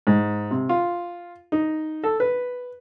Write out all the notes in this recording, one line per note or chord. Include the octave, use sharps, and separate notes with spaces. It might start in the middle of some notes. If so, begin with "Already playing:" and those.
G#2
C3
F4
D#4
A4
B4